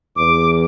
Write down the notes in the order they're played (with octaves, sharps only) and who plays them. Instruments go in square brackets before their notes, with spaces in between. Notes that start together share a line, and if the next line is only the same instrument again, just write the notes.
[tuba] E2 [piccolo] D6